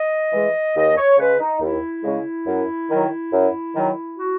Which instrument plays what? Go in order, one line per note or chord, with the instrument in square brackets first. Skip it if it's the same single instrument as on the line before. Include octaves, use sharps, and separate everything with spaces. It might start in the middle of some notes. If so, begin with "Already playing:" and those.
Already playing: [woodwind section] D#5
E3 G#3
D#2 D#5
C#5
C#3 G#3 B4
D#4
D#2 E4
C#3 G#3
F#2
D#3 F#3
F#2
D#3 F#3
F#4